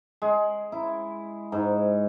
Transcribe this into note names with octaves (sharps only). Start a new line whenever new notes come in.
G#3
E4
G#2